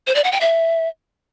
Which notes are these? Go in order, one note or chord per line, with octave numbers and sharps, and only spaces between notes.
C5
D5
F#5
G5
E5